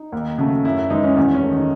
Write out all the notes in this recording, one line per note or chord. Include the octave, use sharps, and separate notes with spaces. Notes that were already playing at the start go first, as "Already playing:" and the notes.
Already playing: D#4
D#2
C#3 F#3 A3
F#2 E4
E4
E3 G#3 D#4
C#4
E2 C#4
C#4
D#3 F#3 A3
D#4